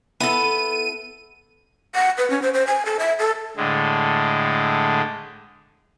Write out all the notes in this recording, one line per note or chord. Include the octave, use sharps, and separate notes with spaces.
B3 E4 A4 D#7
F#5
B4
C#4
C5
C5
G#5
A4
E5
A4
A2 D3 G#3